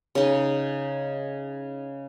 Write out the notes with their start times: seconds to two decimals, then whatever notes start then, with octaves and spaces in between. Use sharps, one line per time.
0.15 C#3 D#4